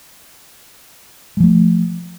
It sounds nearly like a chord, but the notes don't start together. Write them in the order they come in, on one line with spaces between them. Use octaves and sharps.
G#3 F3 A3